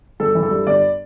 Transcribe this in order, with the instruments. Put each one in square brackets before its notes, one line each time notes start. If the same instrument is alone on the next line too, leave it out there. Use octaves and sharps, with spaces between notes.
[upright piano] G1 A4
E3
A4
G2
G1 D5